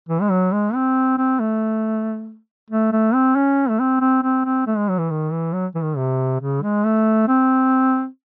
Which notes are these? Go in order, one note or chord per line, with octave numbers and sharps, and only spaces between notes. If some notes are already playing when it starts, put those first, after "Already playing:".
E3
G#3
F#3
G#3
C4
C4
A3
A3
A3
C4
C#4
A3
C4
C4
C4
C4
A3
G#3
F#3
E3
D#3
E3
F#3
E3
D#3
C3
C#3
G#3
A3
C4